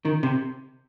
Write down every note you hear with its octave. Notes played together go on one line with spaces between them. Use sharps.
D#3
C3